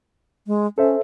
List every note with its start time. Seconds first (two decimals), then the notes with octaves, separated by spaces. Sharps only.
0.47 G#3
0.78 C#4 A4 C5 E5